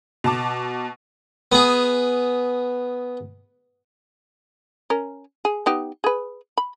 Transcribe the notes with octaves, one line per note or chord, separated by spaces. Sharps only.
B2 A5 D6
B3 G#4
C#4 A#4
G#4
B3 D#4 G4
G#4 B4
B5